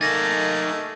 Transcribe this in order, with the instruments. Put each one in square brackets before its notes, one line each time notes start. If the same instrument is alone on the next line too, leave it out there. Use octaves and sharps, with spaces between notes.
[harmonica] A3 A#3 [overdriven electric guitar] D#4 A4 [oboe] G#5 [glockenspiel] A6 A#6 D#7